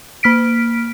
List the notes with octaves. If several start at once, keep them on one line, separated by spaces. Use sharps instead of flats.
A#3 F6 B6 D7